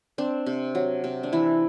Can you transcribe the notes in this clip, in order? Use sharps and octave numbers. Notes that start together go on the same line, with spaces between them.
C4 D4
C3
F#3
C3
D4
E3 E4